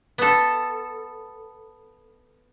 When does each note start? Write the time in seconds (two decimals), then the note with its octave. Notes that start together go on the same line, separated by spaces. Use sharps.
0.18 B3 A4